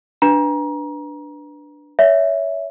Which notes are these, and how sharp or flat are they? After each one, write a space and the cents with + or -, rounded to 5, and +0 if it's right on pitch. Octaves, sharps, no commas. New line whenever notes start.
D4 +0 B4 +0 A#5 +25
C#5 +25 E5 +0